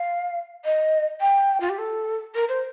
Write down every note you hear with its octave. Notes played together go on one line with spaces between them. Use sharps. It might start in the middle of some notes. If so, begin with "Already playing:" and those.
Already playing: F5
D#5
G5
F4
G4
A4
A#4
C5